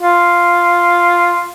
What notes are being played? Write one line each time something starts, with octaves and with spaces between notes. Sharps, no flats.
F4